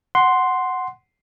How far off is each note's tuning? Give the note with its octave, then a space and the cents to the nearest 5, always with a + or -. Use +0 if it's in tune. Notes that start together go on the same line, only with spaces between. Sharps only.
F#5 +0 C6 +0